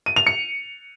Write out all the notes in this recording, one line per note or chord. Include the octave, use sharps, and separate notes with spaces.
D#7
F7
C#7